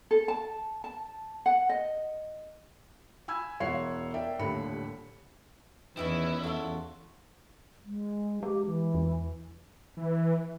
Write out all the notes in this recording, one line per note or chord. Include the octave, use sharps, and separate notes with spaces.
A4
A5
A5
F#5
D#5
G#5 B5 E6 G#6
E1 E3 C#5 F#5 C6 C7
A#4 D5 E5 G5
D#1 A1 D#2 D3 B5 C#7
E2 D#3 E3 C#4 E4 B4
F4 F#4 A4
G#3
G#3 G4
E3
E2
E3